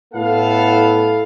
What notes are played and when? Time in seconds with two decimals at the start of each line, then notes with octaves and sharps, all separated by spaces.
0.14 A2 B3 A4 F5